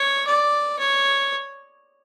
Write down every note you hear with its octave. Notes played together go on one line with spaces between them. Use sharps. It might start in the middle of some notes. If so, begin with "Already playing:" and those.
Already playing: C#5
D5
C#5